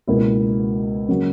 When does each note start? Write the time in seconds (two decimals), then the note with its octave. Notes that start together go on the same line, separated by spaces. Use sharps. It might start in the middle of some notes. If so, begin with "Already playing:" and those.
0.07 C#2 B2 A#3 E4
1.09 C#3 F#3 A#3